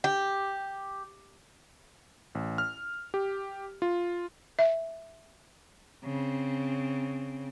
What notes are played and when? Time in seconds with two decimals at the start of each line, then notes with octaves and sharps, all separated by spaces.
0.04 G4
2.35 A1
2.58 F6
3.14 G4
3.82 F4
4.59 E5
6.04 C#3 C4